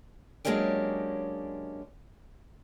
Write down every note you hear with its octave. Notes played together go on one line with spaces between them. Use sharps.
F#3 G#3 A#3 C#4 D4 G4